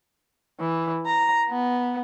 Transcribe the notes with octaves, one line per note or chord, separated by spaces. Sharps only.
E3
A#5
B3